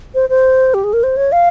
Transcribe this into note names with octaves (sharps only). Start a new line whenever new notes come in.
C5
C5
G4
G#4
A#4
C5
C#5
F5